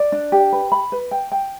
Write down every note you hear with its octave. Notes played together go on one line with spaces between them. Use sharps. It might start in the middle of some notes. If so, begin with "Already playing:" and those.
Already playing: D5
D4
G4
B4
B5
B4
G5
G5